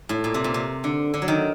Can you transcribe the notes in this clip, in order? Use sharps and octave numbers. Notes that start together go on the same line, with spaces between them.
A2
A#2
C3
A#2
C3
D3
D3
F#3
D#3